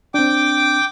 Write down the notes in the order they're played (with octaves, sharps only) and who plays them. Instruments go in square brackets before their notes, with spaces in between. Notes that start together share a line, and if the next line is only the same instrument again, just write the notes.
[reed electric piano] C4 D4 [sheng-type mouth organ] G5 D6